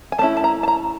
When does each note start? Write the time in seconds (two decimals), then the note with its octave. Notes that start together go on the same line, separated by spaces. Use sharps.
0.12 G#5
0.18 A3 A5
0.22 C#4 E4
0.37 A5
0.44 A#5
0.63 A5
0.68 A#5